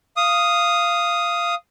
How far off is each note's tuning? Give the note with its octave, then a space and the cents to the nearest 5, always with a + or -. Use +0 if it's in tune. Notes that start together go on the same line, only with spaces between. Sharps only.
F5 -10 D#6 +0